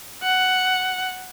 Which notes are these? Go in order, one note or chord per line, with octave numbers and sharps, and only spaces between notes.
F#5